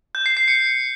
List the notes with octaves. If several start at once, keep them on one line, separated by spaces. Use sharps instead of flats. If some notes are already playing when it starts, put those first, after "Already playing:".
G6
C7
C7
C#7